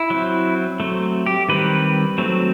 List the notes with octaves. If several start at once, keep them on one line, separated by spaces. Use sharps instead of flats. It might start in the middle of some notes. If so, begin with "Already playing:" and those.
Already playing: E4
F#3 C4
F#3 A3 C4
G4
D#3 G3 C4 B4
F#3 A3 C4